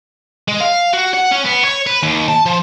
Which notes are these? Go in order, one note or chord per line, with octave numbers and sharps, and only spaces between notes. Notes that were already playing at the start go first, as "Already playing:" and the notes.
G#3
F5
F#4
F#5
C#4
B3
C#5
B4
D#2
A5
F3